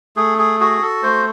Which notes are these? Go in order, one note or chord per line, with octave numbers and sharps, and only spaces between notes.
A3 G#4
G#4
F#4 G#4
A4
A3 C5